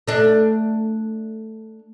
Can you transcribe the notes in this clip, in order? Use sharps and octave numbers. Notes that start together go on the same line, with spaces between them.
A3 D4